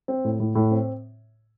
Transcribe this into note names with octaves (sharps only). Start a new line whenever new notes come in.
C4
A2
A2
A2
C4